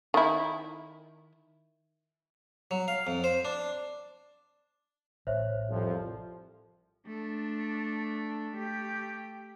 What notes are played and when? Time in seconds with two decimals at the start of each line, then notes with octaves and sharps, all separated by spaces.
0.14 D#3 E4
2.71 F#3
2.88 F5
3.07 F2
3.24 C5
3.45 D4
5.27 A1 C5 C#5 E5
5.69 C2 F2 F3
7.07 A3 D4
8.56 A3 G4